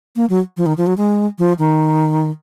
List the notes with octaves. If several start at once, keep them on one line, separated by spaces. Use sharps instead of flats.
A#3
F#3
F3
D#3
F3
F#3
G#3
F3
D#3